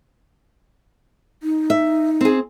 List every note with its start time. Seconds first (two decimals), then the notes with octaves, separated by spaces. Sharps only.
1.43 D#4
1.70 E5
2.21 C4 G#4